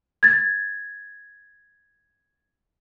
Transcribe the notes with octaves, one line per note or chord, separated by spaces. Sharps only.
G#6 A6